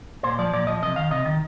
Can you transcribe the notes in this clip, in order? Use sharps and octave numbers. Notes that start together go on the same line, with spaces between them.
A#2 C5
F3 D5
A#2 D5
F3 D#5
C3 D#5
D#3 F5
C3 D#5
D#3